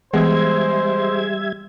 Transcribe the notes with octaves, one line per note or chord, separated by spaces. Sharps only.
E3 G3 G#3 B3 C5 E5 G#6